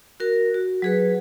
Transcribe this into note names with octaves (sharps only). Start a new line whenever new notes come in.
F#4 A#4
F#4
F#3 G#4 B4